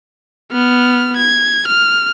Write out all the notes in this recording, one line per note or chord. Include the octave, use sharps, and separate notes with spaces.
B3 F6
G#6
F6